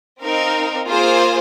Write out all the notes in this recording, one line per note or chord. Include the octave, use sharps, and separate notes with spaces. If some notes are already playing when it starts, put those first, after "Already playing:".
C4 D#4 A#4 F5
A#3 F4 G#4 C5